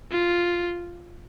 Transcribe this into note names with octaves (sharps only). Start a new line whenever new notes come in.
F4